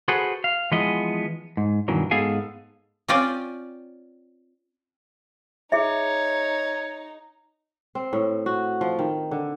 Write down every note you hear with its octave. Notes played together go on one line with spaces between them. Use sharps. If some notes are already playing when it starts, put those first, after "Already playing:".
F#4 G#4 A4 B4 C5 F#5
F5
E3 F3 G#3 B3 G#4 D#5
G#2
G2 B2 D#3 E3 F#3
G#2 B3 G#4 A4 F5 G#5
C4 C#4 F4 D5 G5 G#5
D#4 G#4 C#5 E5
C4
A2
F#4
F3
D#3
D3